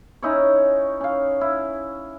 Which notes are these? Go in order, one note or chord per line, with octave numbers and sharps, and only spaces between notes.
C#4 D#4 E4 C#5
C#4 F5
E4